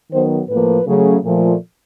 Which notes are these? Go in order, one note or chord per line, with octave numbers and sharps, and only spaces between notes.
D#3 F#3 B3 C5
A2 F3 A#3 B4
C#3 F#3 A3
A#2 F3 A3